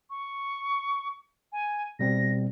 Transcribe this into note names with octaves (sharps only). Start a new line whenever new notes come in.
C#6
G#5
B2 G3 C4 A#6